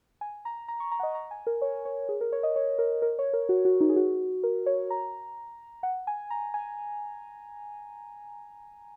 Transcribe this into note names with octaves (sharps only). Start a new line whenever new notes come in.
G#5
A#5
A#5
C#6
A#5
F#5
D#5
A#5
G#5
A#4
C#5
C#5
G#4
A#4
C#5
D#5
C#5
A#4
A#4
C#5
A#4
F#4
F#4
D#4
G#4
F#4
A#4
C#5
A#5
F#5
G#5
A#5
G#5